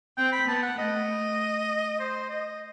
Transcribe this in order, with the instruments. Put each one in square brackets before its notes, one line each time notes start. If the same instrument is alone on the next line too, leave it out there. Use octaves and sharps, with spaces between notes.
[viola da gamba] C4 [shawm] G5
[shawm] B5
[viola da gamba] B3 [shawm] A5
[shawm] F#5
[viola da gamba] A3 [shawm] D#5
[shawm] C5
D#5